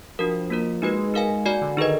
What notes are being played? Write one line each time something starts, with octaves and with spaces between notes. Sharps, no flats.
F3 D4 F#4 A#4
A#3 F4 A#4
G#3 D#4 F#4 B4
D#4 A#4 F5 G#5
A#3 F#4 D5 G#5
D3
D#3 D#4 G#4 B4 D#5